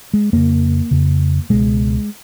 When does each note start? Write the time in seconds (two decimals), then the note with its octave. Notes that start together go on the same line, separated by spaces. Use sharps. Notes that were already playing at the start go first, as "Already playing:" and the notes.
0.14 G#3
0.33 F2 C#3 A#3
0.91 F2 C#3
1.50 C#2 B2 G#3